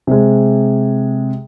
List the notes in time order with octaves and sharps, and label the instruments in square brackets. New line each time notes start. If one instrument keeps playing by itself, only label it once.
[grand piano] C3 G#3